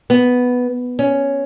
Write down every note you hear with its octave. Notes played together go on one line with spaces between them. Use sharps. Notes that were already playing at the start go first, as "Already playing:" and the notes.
B3
C#4